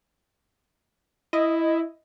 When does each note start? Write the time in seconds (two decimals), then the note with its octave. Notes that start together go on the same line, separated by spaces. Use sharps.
1.33 E4 D#5